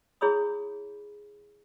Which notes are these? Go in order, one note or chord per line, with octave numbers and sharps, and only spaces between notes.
E4 G#4 C#5 B5 D#6